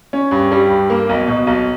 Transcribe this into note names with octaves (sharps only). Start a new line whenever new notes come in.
C#4
G2
G3
G2
A#3
B1
B2
B1